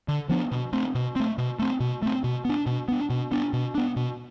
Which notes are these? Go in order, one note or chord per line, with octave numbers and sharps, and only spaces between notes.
D3
F3 B3 D4
B2
A3 C4
B2
A3 C4
B2
A3 C4
B2
A3 C4
B2
B3 D4
B2
B3 D4
B2
B3 D4
B2
B3 D4
B2